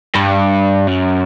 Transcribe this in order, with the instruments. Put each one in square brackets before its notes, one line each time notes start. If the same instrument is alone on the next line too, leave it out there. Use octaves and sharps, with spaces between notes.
[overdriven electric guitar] G2
F#2